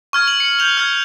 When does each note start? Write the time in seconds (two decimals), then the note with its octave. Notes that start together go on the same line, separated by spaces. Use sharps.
0.13 C#6 F6 G#6
0.28 F#7
0.40 C#7
0.59 G6 F7 G7
0.77 F6 G#6